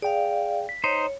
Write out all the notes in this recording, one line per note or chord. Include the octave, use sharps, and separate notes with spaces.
G#4 D5 F5 G5
B6
D#4 C5 C#5